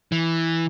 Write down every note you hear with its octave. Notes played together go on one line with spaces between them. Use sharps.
E3